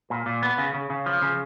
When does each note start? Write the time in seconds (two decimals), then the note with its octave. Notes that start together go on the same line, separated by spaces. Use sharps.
0.10 A#2
0.26 A#2
0.43 B3
0.58 C#3
0.74 C#3
0.90 C#3
1.06 F3
1.22 C#3